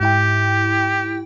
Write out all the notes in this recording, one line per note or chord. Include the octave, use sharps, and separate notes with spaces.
G#2 E4 G4 G5